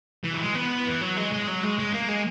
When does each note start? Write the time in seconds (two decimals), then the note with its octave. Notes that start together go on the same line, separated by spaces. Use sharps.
0.24 E3
0.34 F#3
0.41 G#3
0.55 B3
0.86 E3
1.01 F#3
1.17 G#3
1.32 G#3
1.47 F#3
1.63 G#3
1.78 G#3
1.93 A#3
2.08 G#3